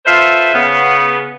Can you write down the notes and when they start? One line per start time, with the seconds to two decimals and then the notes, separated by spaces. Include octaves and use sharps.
0.06 A3 F4 A4 B4 C5 E5
0.54 C#3 B3